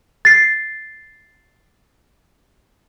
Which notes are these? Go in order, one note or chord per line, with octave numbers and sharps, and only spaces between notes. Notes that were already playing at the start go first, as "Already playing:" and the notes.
A6 C7